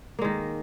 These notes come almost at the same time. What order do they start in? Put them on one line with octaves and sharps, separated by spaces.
A#3 G#3 D#3